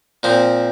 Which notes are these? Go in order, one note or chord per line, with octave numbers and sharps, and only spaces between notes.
A#2 F3 C4